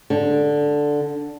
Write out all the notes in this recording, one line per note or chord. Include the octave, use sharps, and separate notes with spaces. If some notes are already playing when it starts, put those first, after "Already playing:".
D3